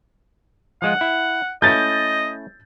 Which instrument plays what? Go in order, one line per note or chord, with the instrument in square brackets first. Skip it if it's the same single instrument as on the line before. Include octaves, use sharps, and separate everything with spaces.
[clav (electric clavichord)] F3 G#3 F4 [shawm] F#5
[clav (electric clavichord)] E4
[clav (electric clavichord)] A3 C#4 E4 [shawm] D#5 [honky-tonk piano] G6 A6